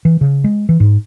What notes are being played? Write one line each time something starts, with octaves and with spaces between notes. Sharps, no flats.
E3
C#3
G#3
E3
G#2